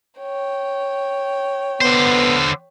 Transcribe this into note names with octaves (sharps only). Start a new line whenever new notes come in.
C#5 G5
D3 B3 C5